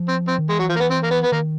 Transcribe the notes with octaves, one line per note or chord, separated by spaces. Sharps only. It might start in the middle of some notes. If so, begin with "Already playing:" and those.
Already playing: F3
C4
C4
D#3
E3 G#3
F#3
F3
A#3
B3
C4
A#3
B3
B3
D#3 A#3